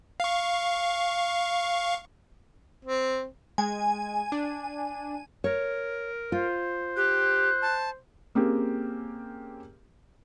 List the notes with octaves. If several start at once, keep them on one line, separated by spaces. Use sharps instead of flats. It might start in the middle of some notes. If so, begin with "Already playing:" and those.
F5 C#6
C4
G#3 G#5
D4
A#4 C#5
F4 C5
G4 F#6
A5
A#3 C4 C#4 G4 G#4